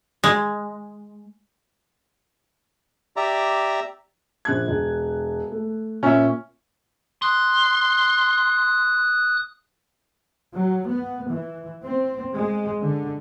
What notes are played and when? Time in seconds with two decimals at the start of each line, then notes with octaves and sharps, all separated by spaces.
0.24 G#3
3.16 G4 D5 E5 A#5
4.45 A#1 F#6 G#6
4.68 E1
5.52 A3
6.03 A#2 C#4 E5
7.22 C6 D#6 F#6
10.54 F#3
10.88 B3
11.31 E3
11.83 C4
12.35 G#3
12.82 D3